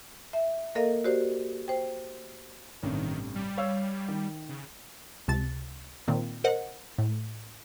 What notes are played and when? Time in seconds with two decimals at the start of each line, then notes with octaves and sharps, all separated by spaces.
0.33 E5
0.75 A#3 A4 A#4 D#5 F5
1.04 F#4 G4 C5 D5
1.68 C5 G5
2.83 A1 G2 C3 D#3
3.35 G3
3.58 C#5 F5 E6
4.08 D#3
4.49 C#3
5.28 C#2 C3 A5 A6
6.08 A#2 D#3 A#3 C4
6.44 A#4 C5 D#5 F#5
6.98 A2